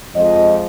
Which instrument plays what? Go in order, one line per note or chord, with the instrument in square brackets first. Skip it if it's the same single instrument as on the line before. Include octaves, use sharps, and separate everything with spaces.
[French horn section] F2 F3 G#3 D#5